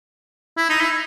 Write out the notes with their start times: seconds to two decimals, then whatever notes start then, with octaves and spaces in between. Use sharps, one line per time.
0.57 E4
0.70 D#4
0.81 E4